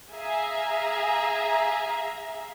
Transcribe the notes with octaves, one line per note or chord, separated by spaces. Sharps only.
G#4 E5 F5 A#5